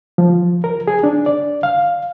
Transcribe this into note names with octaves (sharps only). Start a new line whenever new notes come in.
F3
A#4
G#4
D4
D5
F5